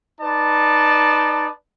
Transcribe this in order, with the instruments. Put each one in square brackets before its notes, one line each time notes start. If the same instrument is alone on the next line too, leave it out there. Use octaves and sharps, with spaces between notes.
[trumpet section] D#4 B4 D5 A5